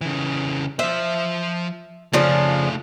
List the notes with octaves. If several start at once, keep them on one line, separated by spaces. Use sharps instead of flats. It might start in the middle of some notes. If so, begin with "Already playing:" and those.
C#3 E3
F3 C5 E5
C#3 F3 A3 D4 F4